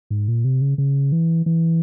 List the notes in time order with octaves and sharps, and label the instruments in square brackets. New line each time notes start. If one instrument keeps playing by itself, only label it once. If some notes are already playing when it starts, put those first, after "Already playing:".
[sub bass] G#2
A#2
C3
C#3
C#3
E3
E3